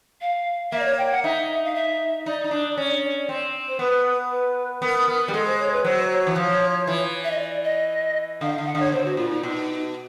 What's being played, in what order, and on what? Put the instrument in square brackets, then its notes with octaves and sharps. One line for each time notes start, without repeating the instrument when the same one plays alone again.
[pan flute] F5
[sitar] A#3 [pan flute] E5
[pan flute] D5
C#5
G5
F#5
[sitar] D#4 [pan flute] E5
[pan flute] F5
E5
[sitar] D#4 [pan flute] D5
[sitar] D#4
D4
C#4
C4
[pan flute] C5
[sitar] B3 [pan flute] B4
[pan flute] B4
[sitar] B3 [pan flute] A#4
[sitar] B3
G3
[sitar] G#3 [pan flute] A4
[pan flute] C5
C#5
B4
[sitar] F#3 [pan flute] C5
[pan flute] C#5
[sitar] E3
F3
E3
[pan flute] E5
D#5
D5
D#5
[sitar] D3 [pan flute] F5
[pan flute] F5
[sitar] D3
[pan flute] F#5
[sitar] D3 [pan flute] C#5
[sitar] B2 [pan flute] C5
[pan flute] F#4
[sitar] A#2 [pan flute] F4
[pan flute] D#4
[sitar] B2